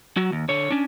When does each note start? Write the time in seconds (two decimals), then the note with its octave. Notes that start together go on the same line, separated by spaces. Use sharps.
0.17 F#3 F#4
0.32 D#2
0.49 D3 C#5
0.70 C#4 D4